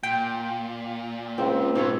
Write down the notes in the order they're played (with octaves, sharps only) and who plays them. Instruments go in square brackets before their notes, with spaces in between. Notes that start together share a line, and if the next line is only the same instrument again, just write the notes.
[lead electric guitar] A#2 [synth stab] G5
[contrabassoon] C#2 [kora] C4
[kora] G#2 A4 C#5 [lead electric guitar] B2